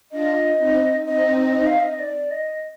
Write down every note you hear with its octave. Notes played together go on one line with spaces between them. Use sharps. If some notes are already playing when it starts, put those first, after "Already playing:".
D4 F4 D#5
C4 D#4
C4 D#4 D#5
D#5
F5
D#5
D5
D#5